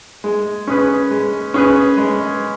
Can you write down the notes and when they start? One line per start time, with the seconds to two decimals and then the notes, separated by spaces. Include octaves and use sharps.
0.24 G#3
0.67 C#4 G#4 B4
1.11 G#3
1.54 C#4 G#4 B4
1.98 G#3